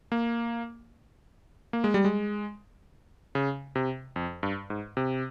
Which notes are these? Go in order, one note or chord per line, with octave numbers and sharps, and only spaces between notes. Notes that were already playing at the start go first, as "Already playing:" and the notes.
A#3
A#3
G#3
G3
G#3
C#3
C3
F2
G2
G#2
C3